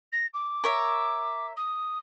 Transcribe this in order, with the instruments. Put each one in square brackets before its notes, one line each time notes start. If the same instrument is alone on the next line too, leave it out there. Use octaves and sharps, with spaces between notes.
[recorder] A#6
D6
[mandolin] A#4 C#5 E5
[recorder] D#6